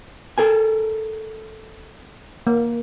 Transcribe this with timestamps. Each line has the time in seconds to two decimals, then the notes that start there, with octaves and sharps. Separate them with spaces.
0.38 A4 A#4 G#5
2.47 A#3